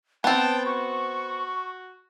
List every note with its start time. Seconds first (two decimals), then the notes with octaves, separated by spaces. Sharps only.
0.24 B3 C4 G5 A5
0.65 F#4 C#6